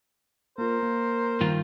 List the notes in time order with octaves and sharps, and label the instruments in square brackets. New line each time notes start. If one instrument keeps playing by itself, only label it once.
[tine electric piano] A#3 F4 [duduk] A#4 [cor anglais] C5
[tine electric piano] A#3
[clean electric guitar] G2 D#3 F4